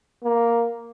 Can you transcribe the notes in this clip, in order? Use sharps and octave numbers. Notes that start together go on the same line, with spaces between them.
A#3